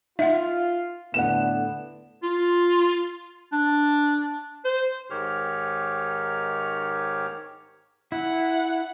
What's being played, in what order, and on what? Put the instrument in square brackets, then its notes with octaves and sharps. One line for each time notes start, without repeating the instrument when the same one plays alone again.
[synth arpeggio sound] D#4 [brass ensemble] F4 [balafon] E5 F#5
[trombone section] A2 D3 B3 [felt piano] F#5 E7
[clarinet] F4
D4
C5
[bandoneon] G#2 D#3 G4 C#5 F6
[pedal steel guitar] E4 [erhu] F#5